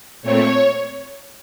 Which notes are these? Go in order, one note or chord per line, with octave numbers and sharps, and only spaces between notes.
A#2 A3 C4 C#5